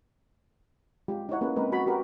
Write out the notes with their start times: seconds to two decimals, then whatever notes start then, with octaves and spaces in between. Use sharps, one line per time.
1.08 G#3 F4 G4
1.29 D#4 E4 C#5 F#5
1.41 A#3 C#4 G#4 B4
1.56 G#3 A#3 C4 D#4 A#4 B4
1.72 F#4 B5
1.87 F#4 G4 A#4 B4